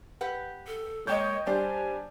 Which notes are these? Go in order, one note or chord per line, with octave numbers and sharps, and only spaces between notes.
G4 B4 F#5
A4
G#3 A#3 C#5 D#5 G5 G6
G3 D4 G4 C5 G#5